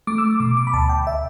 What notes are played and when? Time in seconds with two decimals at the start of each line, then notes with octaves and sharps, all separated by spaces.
0.07 A3 D6
0.18 E6
0.24 D6
0.40 B2 D6
0.57 D6
0.67 B5
0.73 D2 A5
0.89 G5
1.07 E5